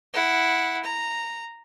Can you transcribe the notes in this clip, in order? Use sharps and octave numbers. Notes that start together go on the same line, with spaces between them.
E4 F#5
A#5